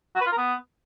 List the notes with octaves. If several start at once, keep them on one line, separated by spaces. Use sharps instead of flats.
F#4
B4
F4
A#4
B3